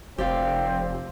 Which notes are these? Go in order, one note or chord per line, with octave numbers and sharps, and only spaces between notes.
F1 C4 G4 D5 F5